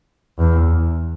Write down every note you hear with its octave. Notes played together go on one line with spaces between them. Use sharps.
E2